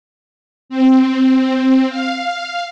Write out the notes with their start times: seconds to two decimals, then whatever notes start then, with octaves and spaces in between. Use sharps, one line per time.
0.69 C4
1.89 F5